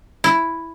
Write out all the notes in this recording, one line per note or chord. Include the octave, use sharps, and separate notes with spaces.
E4